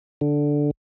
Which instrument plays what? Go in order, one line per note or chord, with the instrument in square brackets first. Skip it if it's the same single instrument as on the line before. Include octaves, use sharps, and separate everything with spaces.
[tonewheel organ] D3